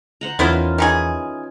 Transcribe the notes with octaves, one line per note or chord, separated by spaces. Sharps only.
C5 F#5 A#5
E2 D#3 B3 C#4 E4 F4 C5
E3 D#4 G#4